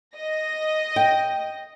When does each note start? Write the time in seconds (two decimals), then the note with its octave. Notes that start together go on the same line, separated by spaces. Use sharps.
0.15 D#5 A#6
0.96 G5